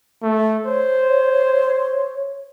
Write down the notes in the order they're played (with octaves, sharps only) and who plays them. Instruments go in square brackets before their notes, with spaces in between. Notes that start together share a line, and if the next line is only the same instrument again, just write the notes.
[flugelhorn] A3
[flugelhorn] C5 [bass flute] C#5